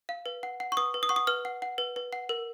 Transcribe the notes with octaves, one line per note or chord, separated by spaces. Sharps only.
F5
B4
F#5
F#5
C#6
B4 D#6
B4
D#6
F#5 C#6
D#6
B4 F6
F#5
F#5
B4
B4
F#5
A#4